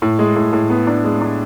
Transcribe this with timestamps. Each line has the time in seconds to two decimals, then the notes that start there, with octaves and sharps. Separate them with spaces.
0.02 A2
0.19 G#3
0.36 A2
0.53 A2
0.70 B3
0.87 D4
1.04 G#3
1.21 D4